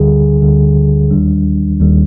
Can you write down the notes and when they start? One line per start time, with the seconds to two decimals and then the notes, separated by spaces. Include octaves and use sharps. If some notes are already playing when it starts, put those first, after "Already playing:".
Already playing: D2 D3 G3 G#4
0.42 D2 D3 G3
1.11 D#2 D#3 G3 D4
1.80 D#2 D#3 G3